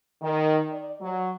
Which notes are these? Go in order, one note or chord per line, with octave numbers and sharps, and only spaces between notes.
D#3
D5
F#3